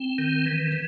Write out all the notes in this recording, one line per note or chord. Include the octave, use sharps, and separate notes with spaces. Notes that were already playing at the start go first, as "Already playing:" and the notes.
Already playing: C4
D#3
E3
E3